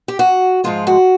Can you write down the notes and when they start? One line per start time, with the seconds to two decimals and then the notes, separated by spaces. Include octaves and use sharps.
0.08 G4
0.19 F#4
0.64 G#2 F3 G#3 F4
0.87 F#4